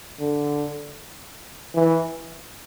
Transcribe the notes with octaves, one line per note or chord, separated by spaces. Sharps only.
D3
E3